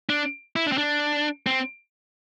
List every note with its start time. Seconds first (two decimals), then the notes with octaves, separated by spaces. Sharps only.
0.09 D4
0.56 E4
0.67 D4
0.72 C4
0.78 D4
1.47 C4